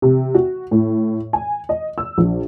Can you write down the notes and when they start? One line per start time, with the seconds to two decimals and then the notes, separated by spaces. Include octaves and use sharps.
0.02 C3
0.35 F#4
0.71 A2
1.33 G#5
1.69 D#5
1.98 E6
2.18 A#1